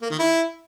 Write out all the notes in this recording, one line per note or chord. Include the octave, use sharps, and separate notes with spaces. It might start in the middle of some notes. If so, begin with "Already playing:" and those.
A#3
D#3
E4